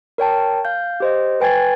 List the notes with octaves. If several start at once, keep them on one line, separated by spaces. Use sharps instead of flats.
A#4 C#5 G5 A5
F5 G6
G4 C5 D#5
B4 G5 G#5 G#6 A6